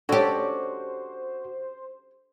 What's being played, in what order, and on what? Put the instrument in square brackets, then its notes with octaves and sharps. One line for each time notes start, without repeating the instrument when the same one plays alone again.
[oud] C#4 G4 [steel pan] D4 A4 [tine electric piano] F#4 [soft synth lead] C5